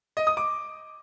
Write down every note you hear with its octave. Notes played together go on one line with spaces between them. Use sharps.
D#5
D#6
D6